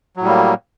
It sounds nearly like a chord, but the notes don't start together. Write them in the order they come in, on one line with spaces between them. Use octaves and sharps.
F#3 A2 G3 A#3